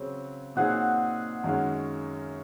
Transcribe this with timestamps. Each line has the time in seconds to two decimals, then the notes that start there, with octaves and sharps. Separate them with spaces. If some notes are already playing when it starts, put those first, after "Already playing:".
Already playing: C#3 F#3 C4
0.56 A#2 F#3 C4 D#4 G#4 F#5
1.44 F#2 D#3 G#3 C#4 F5